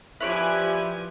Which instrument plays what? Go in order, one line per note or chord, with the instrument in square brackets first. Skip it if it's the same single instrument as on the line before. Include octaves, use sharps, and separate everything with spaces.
[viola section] F3 G4 G#5 [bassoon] E4 [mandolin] B4 C#5 D5